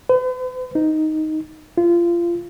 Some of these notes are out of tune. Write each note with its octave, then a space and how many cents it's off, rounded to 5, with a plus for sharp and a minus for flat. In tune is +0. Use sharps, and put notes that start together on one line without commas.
B4 +45
D#4 +5
F4 -25